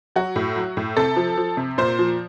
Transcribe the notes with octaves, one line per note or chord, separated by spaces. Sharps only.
F#3 F#4
A2
F#3
A2
C3 A4
F3
F3
C3
A#2 C5
F3